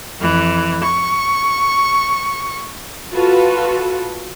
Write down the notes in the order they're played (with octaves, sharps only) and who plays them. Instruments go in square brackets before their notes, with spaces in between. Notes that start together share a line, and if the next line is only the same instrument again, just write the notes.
[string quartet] F2 E3
C#6
[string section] F4 F#4 A4 B4